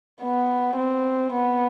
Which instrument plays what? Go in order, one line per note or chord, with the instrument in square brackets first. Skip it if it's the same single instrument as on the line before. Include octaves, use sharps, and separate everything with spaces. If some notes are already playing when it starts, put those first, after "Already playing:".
[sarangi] B3
C4
B3